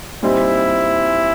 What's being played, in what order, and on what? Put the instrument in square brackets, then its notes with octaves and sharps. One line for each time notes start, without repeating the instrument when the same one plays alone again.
[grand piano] A#2 G3 C4 D#4 [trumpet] E4